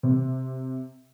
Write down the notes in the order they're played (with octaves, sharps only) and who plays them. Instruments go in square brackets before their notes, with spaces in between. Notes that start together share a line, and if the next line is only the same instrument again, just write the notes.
[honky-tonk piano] C3